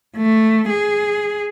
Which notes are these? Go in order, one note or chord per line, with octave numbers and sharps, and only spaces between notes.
A3
G#4